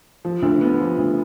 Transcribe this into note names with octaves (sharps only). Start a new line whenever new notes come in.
F3
D2
B3
F3
D2